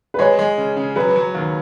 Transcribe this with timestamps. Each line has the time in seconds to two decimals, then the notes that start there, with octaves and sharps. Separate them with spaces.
0.14 B4
0.19 G#3 C#5
0.39 G#3
0.58 C#3
0.77 C#3
0.96 F#3 B4
1.16 F#3
1.35 D#2